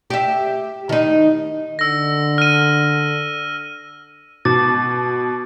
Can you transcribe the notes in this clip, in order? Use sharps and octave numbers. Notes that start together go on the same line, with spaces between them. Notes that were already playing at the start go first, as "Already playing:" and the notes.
G4 E5
D#3 D#4
D3 E6 A#6
F6 D#7
B2 A5 D6 A6